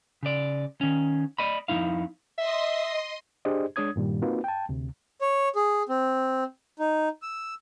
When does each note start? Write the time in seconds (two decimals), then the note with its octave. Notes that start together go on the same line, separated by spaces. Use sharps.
0.23 C#3 D5
0.81 D#3 C#4
1.38 D5 D#5 B5
1.68 F2 E3 D#4 E4 F5
2.38 D#5 E5 C6 D#6
3.45 D4 G4 G#4 C5 D5 D#5
3.76 G#3 D4 C#5 D#6 G#6
3.96 G2 A#2 D#3 G3
4.22 A#3 C4 D#4 F4 F#4 B4
4.44 G5 A5
4.69 D2 C3
5.21 C#5
5.55 G#4
5.89 C4
6.79 D#4
7.22 E6